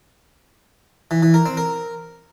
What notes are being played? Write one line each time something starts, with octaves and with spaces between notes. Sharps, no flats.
E3
E3
A#4
C4
A#4